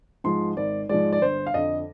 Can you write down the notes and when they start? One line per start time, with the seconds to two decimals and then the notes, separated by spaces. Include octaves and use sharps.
0.24 G#2 F3 G#3 C6
0.56 G#1 D5
0.89 G#2 F3 G#3 D5
1.12 D5
1.22 G1 C5
1.47 F5
1.54 F2 D3 D#5